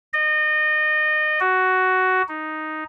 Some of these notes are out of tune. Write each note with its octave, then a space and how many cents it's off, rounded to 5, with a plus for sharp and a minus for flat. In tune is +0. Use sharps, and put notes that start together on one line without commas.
D#5 -30
F#4 +10
D#4 +0